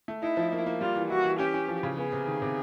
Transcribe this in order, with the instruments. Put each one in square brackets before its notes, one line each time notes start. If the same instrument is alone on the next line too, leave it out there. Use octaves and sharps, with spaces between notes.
[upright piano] A3
[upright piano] D#4 [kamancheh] E4
[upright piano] F3
A#3
A#3
[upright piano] G3 [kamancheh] F4
[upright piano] E3
[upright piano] E4 [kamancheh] F#4
[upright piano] E3
[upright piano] C#4 [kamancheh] G4
[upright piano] C#4
F3
C#3
[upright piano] B3 [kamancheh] G#4
[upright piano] C3
D#3
C3